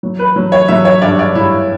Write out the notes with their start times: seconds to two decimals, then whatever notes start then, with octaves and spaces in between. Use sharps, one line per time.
0.03 F#3
0.19 B4
0.36 F#3
0.52 C#5
0.68 F#3 E5
0.85 C#5
1.02 G2 D5
1.19 D5
1.35 G2 E4